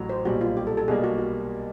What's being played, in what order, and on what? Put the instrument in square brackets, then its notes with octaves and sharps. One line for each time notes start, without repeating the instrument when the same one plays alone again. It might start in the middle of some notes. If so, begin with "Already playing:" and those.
Already playing: [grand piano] A1 A2 F#3
[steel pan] C5
[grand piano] B1 A#2 G3 [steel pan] F#4
[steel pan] F4
G4
A4
A4
[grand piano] B1 B2 G3 A#3 D4 [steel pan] G#4
[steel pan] F#4
F#4